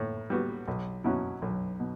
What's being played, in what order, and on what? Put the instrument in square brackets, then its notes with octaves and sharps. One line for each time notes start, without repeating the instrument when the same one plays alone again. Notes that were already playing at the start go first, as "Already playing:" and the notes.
Already playing: [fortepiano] A2
G3 B3 F#4
B1
B2 F#3 C#4 E4
B1
B2